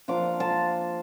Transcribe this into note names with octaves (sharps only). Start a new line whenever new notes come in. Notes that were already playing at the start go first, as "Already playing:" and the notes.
F3 A#3 D4 F4 A#5 D6
A5 C6